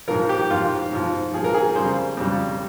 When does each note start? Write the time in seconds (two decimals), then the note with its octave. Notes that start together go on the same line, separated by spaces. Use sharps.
0.08 G#2 F3 A#4
0.29 G4
0.50 G#2 F3 F4
0.92 G#2 F3
1.34 G#2 F3 G#4
1.44 A#4
1.54 G#4
1.75 F2 C#3 G3 C5
2.17 F2 C#3 G3